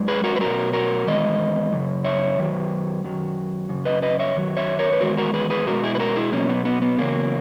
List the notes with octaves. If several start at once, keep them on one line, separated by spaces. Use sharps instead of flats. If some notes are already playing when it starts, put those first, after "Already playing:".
Already playing: F#2 G#3
G#4 B4
F#4 A#4
B4
B2 F#3 F#4 A#4
F#4 A#4
E2 D#3 G#3 D#5
F#2 C#3
C#5 E5
F#2 D#3 F#3
F#2 D#3 F#3
F#2 C#3
B4 D#5
B4 D#5
C#5 E5
F#2 D#3 F#3
C#5 E5
A#4 C#5
B4
E2 D#3 G#3 F#4 A#4
F#4 A#4
G#4 B4
G#4 B4
B2 G#3 F#4 A#4
E4 G#4
B4
F#4 A#4
E4 G#4
B2 F#3 A#3 C#4
B3
B3
B3
E2 C#3 F#3 A#3